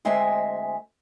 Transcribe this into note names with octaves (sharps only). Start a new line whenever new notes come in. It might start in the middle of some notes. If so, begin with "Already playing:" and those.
D2 G#3 C4 D#5 E5 G#5